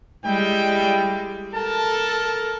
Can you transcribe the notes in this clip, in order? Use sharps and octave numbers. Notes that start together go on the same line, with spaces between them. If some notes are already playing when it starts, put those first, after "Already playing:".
G3 G#3 E4 G5
A4 A#4 A5